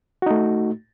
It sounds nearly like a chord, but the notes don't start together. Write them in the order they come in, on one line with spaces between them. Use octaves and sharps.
F#4 D#4 A3